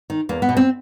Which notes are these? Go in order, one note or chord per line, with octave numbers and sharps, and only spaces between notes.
D#3
E2 A#3
B3
B2
C4